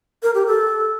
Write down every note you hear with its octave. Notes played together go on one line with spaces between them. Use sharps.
A#4
G4
A4